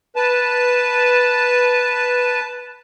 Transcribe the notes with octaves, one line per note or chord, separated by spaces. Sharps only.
B4 A5